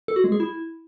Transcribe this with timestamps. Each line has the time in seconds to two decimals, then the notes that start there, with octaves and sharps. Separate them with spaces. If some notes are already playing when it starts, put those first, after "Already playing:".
0.08 A4
0.16 F#4
0.24 G#3
0.32 G#4
0.40 E4